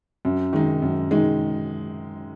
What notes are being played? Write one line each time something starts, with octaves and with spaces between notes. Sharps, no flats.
F#2
D#3 G#3 D#4
F#2
D#3 G#3 D#4